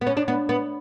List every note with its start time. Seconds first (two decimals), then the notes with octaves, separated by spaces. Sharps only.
0.01 B3
0.07 C#4
0.17 D4
0.28 B3
0.49 B3